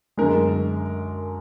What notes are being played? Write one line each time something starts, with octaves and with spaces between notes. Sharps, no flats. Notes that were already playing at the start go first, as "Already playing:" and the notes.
F#2 D3 G#3 A#4